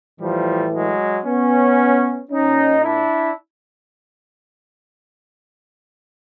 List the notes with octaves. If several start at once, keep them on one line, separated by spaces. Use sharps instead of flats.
A2 E3 F3 G3
F#3 G#3
B3 C#4
A#2 C#4 D#4
D4 E4